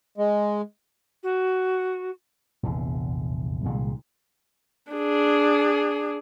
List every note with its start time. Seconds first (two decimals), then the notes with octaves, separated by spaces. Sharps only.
0.18 G#3
1.23 F#4
2.63 F1 A#1 E2 D3
3.64 C2 A#2 D#3 G#3
4.91 D4 G#4